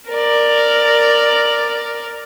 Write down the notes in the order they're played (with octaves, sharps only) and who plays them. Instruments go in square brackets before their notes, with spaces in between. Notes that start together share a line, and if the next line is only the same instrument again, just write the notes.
[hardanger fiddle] A#4 D5